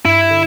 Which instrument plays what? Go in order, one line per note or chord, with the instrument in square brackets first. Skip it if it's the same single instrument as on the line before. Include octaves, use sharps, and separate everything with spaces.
[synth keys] G2 [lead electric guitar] E4
[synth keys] D3